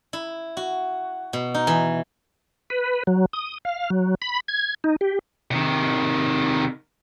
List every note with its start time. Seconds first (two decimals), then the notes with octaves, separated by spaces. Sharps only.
0.13 E4
0.57 F#4
1.33 B2
1.54 D#4
1.67 E3
2.70 B4
3.07 F#3
3.33 D#6
3.65 F5
3.90 F#3
4.22 B5
4.48 G#6
4.84 D#4
5.01 G4
5.51 C3 D#3